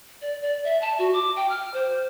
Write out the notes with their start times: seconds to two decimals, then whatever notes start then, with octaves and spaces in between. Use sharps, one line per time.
0.22 D5
0.42 D5
0.65 E5
0.81 A5
0.99 F#4
1.13 D6
1.36 G5
1.50 F6
1.74 C5